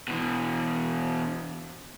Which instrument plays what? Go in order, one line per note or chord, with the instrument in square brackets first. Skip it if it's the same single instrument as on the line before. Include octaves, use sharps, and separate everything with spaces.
[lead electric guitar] B2 E3